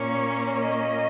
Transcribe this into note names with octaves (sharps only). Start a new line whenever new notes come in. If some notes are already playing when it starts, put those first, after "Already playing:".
Already playing: A#2 A#3 C#4 C#5
D#5